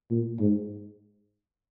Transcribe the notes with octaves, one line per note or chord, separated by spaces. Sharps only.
A#2
G#2